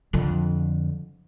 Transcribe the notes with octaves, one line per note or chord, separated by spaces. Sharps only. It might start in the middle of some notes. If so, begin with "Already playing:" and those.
F2 D3